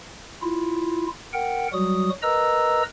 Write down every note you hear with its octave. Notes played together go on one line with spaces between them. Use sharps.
E4 F4
A#4 F#5 G5
F#3 G3 F#4 D#6
A#4 B4 D#5 A#5 E6